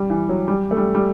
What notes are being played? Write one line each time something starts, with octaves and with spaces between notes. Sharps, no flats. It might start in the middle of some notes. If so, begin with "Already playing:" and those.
Already playing: G3
E3
F#3
G3
A3
G3
G3